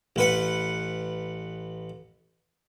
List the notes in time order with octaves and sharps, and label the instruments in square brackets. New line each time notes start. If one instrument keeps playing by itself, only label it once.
[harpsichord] A1 B4 F#5